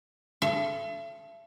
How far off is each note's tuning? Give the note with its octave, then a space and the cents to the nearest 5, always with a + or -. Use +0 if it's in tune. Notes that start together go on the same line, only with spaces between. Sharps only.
A4 -15 E5 +40